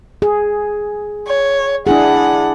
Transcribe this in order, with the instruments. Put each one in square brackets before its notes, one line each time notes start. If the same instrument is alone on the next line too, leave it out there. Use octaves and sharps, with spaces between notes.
[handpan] G#4
[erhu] C#5
[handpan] D4 E4 G#4 [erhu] F#5